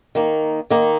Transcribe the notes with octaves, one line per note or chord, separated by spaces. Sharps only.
D#3 A#3 D#4
D#3 A#3 D#4